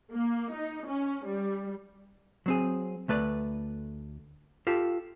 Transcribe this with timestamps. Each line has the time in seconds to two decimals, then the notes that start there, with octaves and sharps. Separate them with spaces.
0.12 A#3
0.53 D#4
0.87 C#4
1.26 G3
2.46 F#3 C4 G#4
3.08 D2 A3 B4 D5
4.67 F4 G4 A4